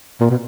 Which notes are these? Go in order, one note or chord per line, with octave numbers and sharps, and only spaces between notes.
A#2
B2